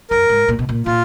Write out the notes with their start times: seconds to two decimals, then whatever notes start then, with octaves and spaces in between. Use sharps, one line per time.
0.10 F#2 A#4
0.29 G#2
0.48 A#2
0.59 B2
0.69 A#2
0.86 A#2 F4